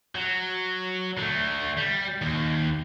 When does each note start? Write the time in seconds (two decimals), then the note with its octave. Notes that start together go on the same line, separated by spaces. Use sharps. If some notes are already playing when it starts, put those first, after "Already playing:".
0.15 F#3
1.18 D3 A3
1.77 G3
2.22 D#2